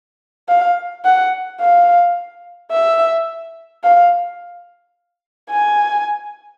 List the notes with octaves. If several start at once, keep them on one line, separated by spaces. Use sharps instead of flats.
F5
F#5
F5
E5
F5
G#5